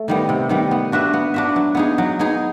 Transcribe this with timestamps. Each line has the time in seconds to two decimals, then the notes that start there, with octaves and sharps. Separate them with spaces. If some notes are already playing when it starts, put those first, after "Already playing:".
Already playing: A3
0.08 D#3 G3 B3
0.29 C3
0.49 D#3 G3 B3
0.71 B3
0.92 D4 F#4 B4 E5
1.13 B3
1.34 D4 F#4 B4 E5
1.56 F#3
1.75 B3 D#4 G#4
1.98 F#3
2.19 B3 D#4 G#4